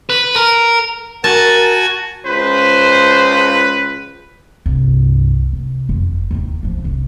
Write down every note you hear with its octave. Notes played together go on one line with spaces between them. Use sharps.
B4
A#4
F#4 A#4 G#5 A5 G#6
C#2 B4 C5
C2 G2
C2
F#1 F2
D#2 A#3
C#2 F3
F#1 C2